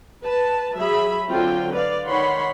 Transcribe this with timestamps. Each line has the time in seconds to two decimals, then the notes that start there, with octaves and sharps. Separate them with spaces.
0.23 B4 A5
0.76 F#3 G#4 E5 B5
1.28 D3 F#3 C4 F4 G5
1.73 B4 D5 F5
2.07 D#3 C#5 F#5 B5 C6